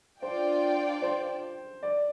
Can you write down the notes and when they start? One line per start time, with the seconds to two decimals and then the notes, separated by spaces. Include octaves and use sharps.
0.22 D4 F4 C5 D5 G5
1.02 C5
1.83 D5